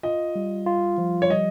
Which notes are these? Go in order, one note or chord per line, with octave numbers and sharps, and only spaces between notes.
F4 D#5
G3
F4
F3
C#5
G3 D#5